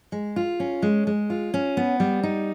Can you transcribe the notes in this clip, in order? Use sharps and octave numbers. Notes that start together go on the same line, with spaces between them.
G#3
F4
C#4
G#3
G#3
F4
C#4
B3
G3
D#4